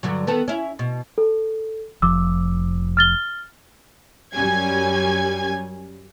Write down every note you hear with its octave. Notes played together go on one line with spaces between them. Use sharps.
G2 D3 F#3
D#3 B3 A4
C#4 E4
B2
A4
F1 F3 D6 E6
F6 A6 G7
F#2 G3 C#4 G#5 G#6